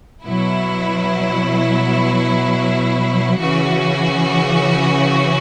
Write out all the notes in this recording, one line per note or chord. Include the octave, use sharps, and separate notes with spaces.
B2 F#3 E4
C#3 E3 C#4 F#4